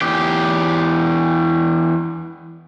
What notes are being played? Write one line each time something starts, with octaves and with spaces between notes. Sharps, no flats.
E2 G4